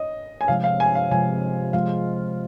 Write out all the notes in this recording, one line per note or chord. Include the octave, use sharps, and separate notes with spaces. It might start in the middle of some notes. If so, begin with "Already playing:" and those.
Already playing: D#5
G#5
C3 F3 G#3 F5
F5
G#5
F5
C3 F3 G#3 G#5
F3 G#3 F4 F5